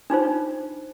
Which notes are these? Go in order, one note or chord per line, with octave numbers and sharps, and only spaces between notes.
D4 D#4 F4 C5